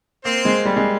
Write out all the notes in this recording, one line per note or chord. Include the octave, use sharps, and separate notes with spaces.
A#3 C4 C5
G#3
G3
G#3